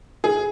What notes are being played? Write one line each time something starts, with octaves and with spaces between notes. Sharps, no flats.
G#4